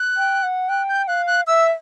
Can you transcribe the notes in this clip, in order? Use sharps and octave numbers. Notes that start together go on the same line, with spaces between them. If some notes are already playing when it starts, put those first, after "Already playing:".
Already playing: F#6
G5
F#5
G5 F#6
G6
F5 F#6
F#6
E5 E6